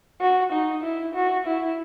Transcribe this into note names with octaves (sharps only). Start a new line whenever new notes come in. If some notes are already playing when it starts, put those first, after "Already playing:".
F#4
D#4
E4
F#4
E4